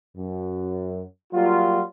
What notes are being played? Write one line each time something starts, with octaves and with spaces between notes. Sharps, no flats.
F#2
F#3 G3 A#3 F4